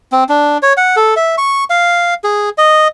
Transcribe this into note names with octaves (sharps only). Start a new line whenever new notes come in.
C4
D4
C#5
F#5
A4
E5
C#6
F5
G#4
D#5